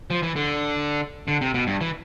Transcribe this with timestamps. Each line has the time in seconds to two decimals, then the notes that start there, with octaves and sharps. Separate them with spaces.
0.10 F3
0.23 E3
0.36 D3
1.28 D3
1.41 C3
1.54 B2
1.67 G2
1.81 E3